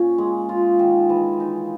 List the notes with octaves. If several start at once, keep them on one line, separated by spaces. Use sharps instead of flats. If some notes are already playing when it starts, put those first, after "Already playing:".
Already playing: A#2 C#4
G#3
F4
D#3
E3
D#4